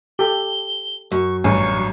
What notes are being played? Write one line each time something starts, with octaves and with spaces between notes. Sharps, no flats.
G4 A4 G7
F#2 C#6
A1 G2 F#3 G#5 C#6